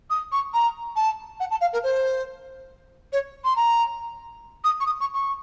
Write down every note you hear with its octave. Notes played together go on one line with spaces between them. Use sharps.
D#6
C#6
A#5
A5
F#5
A5
F5
A#4
C5
C#5
C6
A#5
D#6
C#6
D#6
C#6
C#6